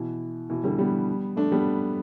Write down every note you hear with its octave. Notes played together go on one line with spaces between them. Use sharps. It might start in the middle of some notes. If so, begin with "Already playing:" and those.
Already playing: B2 E3
B2 E3
D3 G3
G3 B3
A3 D4
G3 B3